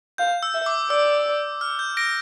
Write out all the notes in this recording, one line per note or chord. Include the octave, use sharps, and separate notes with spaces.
F5 G6
E6
E5
D6
D5 E6
F6
G6
A#6 D7